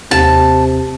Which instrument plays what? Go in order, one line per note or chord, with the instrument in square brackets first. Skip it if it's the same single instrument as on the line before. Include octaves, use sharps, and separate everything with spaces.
[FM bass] D#2 [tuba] C3 [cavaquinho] A5